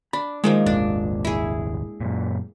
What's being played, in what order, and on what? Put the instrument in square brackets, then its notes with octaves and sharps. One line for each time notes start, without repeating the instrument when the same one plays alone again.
[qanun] D4 [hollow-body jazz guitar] B5
[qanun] D#3 F3 A#3 [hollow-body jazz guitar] G#3
[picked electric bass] D#1 G#1 [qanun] D4
[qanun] E4 G#4
[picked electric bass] F#2 A#2